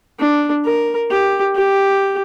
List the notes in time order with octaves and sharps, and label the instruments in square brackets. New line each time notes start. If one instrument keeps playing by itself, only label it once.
[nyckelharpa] D4
A#4
G4
G4